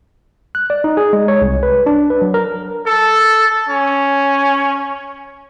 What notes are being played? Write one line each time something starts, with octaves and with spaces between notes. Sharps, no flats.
F#6
D5
D#4
G#4
G#3
C#5
C2
B4
D4
B4
F#3
A#4
A4
C#4